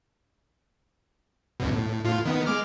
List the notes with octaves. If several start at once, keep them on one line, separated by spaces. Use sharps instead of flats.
C#2 F#2 B2
A2
A2 F4
D#3 B3
G#3 D6 F6